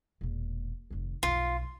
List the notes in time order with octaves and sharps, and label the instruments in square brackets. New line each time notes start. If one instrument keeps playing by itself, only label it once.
[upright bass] E1 A#2
F1 D#3
[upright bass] B1 F2 [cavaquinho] F4